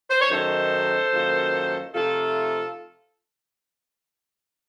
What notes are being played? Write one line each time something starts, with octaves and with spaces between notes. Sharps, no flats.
C5
C#5
F#2 D#3 A3 D#4 A4 C5
F#2 D#3 A#3 F4
C3 F3 A3 D#4 F4 A4